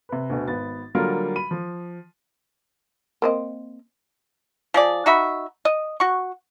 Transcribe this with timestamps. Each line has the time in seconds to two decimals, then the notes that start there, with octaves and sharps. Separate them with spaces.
0.09 C3 B4
0.30 D2 B2
0.48 G#1 B3 A6
0.95 D3 F#3 G3 A#3 F4 A#4
1.36 B5 D#7
1.51 F3
3.22 A#3 C4 D#5
4.74 F3 G#4 D5
5.06 D#4 F#4 E5 B5
5.65 D#5
6.00 F#4 C#6